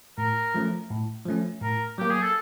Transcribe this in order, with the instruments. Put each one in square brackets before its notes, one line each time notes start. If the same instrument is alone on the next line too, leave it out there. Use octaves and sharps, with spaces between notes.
[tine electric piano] A2 [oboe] A#4
[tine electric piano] F3 A3 C#4
A2
F3 A3 C#4
[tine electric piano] A2 [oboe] A#4
[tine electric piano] F#3 A#3 [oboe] G4
[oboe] G#4
A4